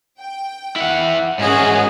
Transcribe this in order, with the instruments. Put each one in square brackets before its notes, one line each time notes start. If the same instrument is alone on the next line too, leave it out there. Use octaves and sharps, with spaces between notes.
[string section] G5
[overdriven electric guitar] E4 F#5
[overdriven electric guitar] G#2 F#4 [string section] C#4 G#4 C#5